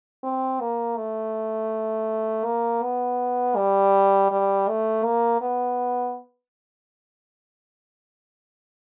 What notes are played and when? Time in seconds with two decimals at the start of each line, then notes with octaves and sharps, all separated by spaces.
0.24 C4
0.61 A#3
0.97 A3
2.45 A#3
2.83 B3
3.56 G3
4.31 G3
4.69 A3
5.05 A#3
5.41 B3